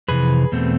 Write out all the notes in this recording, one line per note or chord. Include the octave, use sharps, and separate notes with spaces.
F2 C3 E3 G#4 B4
E2 B2 A3 C4